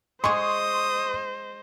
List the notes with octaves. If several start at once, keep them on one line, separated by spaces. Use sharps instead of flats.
G#3 G#4 C5 D#5 C6 C#6 D#6